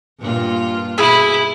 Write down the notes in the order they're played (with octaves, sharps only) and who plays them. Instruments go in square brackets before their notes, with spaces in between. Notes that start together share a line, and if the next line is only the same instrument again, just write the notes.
[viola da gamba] G2 A#2 F4
[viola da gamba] B2 [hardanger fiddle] E4 [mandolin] G#4 B4 E6